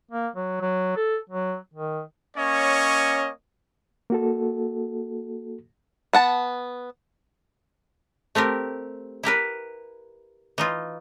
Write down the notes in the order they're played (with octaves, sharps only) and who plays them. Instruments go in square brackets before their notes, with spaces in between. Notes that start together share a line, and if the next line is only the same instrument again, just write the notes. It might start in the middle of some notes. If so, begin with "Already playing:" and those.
[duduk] A#3
F#3
F#3
A4
F#3
D#3
[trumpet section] A#3 C#4 C#5 D#5
[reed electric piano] A#3 F#4 A4
[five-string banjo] B3 F#5 A5
[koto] A3 C4 G4 A#4
E4 G4 A#4 B4
E3 D#4 F4